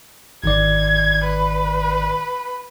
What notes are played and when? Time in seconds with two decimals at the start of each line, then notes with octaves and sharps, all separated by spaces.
0.44 G#1 D#3 D5 G#6
1.24 B4